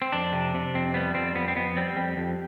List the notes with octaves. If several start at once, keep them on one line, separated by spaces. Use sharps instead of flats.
C4
F2 D4
C3
C3
F2 C4
G3 B3
F2 C4
F2 B3
C4
F2 B3
G3 C4
F2 G4
F2